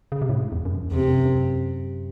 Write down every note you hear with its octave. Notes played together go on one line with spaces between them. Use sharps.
C#3
C3
A2
G#2
E2
F#2
E2
E2 C3
F#2
F#2